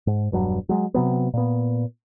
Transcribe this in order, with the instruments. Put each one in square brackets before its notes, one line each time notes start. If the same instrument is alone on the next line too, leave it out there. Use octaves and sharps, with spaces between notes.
[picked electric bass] G#2
E1 G2 F#3
F#3 G#3
C3 F#3 B3
A#2 B3